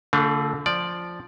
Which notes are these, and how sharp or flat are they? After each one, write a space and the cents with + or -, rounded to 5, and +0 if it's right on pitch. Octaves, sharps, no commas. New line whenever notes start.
D3 -30 A3 +30 F4 +0
F3 +0 D5 +0